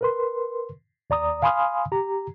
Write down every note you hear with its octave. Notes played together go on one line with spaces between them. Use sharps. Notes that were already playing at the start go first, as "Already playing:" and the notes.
A#4 B4 C6
D#2 D5 A#5 D#6
F5 G#5 B5 C6 D#6 F6
G4 A#5